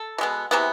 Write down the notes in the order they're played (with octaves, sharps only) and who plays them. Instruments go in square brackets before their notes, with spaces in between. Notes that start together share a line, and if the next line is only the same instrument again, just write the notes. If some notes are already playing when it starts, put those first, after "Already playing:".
Already playing: [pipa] A4
B2 G#3 B3
C3 E3 G#3 B3